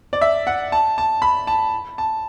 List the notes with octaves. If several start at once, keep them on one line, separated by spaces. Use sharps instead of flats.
D5
E5
F#5
A5
A5
B5
A5
A5